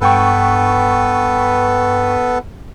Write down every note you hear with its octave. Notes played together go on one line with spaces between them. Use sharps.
G2 B3 A4 B4 G5 C#6